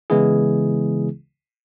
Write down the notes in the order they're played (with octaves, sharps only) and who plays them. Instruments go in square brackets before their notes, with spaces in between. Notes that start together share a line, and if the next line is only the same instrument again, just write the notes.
[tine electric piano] C#3 E3 G#3 B3 E4 G#4